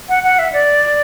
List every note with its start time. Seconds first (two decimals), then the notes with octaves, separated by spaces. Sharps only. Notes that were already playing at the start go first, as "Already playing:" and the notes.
0.09 F#5
0.23 F#5
0.39 E5
0.53 D5